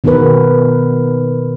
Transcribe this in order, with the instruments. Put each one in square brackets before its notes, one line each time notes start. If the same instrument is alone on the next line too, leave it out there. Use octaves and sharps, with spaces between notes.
[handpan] B2 D#3 B3 D#4 A#4 B4